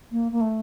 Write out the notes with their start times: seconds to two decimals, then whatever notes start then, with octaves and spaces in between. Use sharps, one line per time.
0.12 A#3
0.32 A#3
0.41 A3